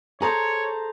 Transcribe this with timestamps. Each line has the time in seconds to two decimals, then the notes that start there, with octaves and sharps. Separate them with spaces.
0.22 G#4 A4 C5 C#5 A#5